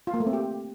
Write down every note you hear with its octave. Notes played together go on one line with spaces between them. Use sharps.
F4
A#3
A3
C4
G4